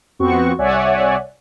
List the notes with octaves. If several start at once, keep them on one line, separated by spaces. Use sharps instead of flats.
F2 B3 C4 F#4 C#6
C2 C#5 D5 E5 F#5 G#5